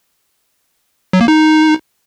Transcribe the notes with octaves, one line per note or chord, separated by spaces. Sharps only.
F#3
A#3
D#4